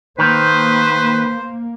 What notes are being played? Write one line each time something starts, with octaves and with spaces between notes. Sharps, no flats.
D#3 A#3 B4 C5